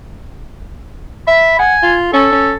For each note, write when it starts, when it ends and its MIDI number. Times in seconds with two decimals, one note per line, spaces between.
1.27 1.56 76
1.27 1.57 83
1.59 1.74 78
1.59 1.93 80
1.83 2.12 65
2.13 2.28 61
2.13 2.55 69
2.32 2.54 61